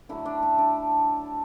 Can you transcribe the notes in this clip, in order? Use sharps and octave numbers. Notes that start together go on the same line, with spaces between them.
D3 F#3 A3 E4
D4
E4
D4